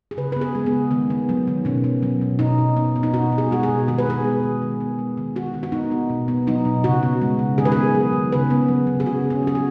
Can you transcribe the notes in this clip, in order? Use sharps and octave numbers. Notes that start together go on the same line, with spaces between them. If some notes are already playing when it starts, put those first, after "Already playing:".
G#4
C#3 B4
B3 B4
G#4
G#3
B3
C#3
D#3 B3
B3
F#3
D#3
B2 C#4
B3
F#3
B2
B2 D#4
B2
B3
B3
D#4
B2 F#4
B3
G#4
G#3 F#4
G#4
B2
D#3 G#4
B4
B3 G#4
G#3
D#3
D#3
B3
G#3
D#3
D#3 F#4
D#3
F#4
B3 D#4
B3
B2
B3
F#3 D#4
B2
C#3 F#4
B3
G#3
C#3
D#3 G#4
B4
B3 G#4
F#3
D#3
C#3 B4
B3
F#3
C#3
G#4
C#3 F#4
B3
C#4
F#3 G#4
F#4